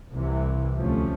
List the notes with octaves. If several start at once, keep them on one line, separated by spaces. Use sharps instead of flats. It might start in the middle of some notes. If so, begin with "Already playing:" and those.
C2 C3 E3
D2 C3 F3 A3 C#4